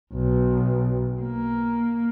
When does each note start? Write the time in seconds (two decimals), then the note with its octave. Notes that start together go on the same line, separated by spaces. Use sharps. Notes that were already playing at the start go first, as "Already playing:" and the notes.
0.13 B1
1.21 A#3